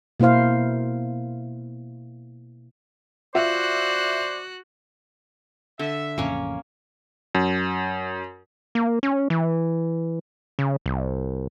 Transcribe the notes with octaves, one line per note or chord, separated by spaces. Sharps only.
B2 A#3 E4 C5 F5
F4 F#4 C5 D5 E5 F#6
D3 E5
A1 F2 C#3 A#3 C#4
F#2
A#3
C#4
E3
C#3
C2